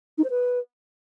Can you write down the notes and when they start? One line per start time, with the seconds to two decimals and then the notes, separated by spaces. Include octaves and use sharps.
0.18 D#4
0.24 C5
0.30 B4